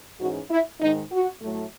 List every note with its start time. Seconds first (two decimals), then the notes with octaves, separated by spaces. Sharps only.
0.19 G#2 E3 G#3 C#4 F#4
0.50 E4
0.80 G#2 D#3 G#3 D#4
1.11 F#4
1.41 A2 F#3 A3